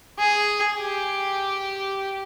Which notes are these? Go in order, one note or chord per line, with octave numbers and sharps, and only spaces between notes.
G#4
G4